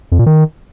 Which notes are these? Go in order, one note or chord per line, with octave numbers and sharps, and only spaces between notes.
F2
A#2
D#3